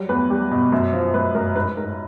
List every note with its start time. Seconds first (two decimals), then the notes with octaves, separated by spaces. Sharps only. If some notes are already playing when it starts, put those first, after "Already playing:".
Already playing: F#3 G3
0.09 E2 B4
0.30 G3
0.51 B2
0.72 F#2
0.93 F3
1.14 F#2 B4
1.35 F#2 A#4
1.56 G#2 B4
1.77 G#2 A#4